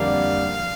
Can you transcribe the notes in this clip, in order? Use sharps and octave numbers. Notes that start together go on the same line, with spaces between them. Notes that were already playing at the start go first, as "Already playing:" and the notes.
Already playing: F2 D3 G3 A#3 D4 F5